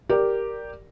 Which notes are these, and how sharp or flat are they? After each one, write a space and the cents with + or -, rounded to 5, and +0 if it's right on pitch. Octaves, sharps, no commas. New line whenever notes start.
G4 +0 A#4 +0 D5 +0